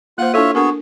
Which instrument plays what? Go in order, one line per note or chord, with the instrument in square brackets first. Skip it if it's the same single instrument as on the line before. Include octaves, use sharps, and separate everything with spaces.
[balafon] A#3 C5 [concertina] F4 F#5 F#6
[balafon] D4 E4 A4 [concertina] F4 C#5 E5
[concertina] B3 F#4 G#4 [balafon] D4 A#4